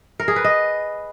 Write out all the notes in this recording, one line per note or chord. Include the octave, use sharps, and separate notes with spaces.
A#4
G#4
B4
D#5